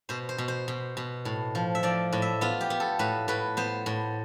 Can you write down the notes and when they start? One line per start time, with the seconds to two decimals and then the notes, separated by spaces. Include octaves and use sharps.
0.09 B2 C5
0.29 C5
0.38 B2
0.48 C5
0.68 B2
0.97 B2
1.25 A2
1.55 F3
1.75 E5
1.83 F3 D5
2.13 A2
2.22 E5
2.41 B3 F4
2.61 G4
2.70 B3
2.80 A4
2.99 A2 B4
3.28 A2 B4
3.57 B3 C5
3.86 A2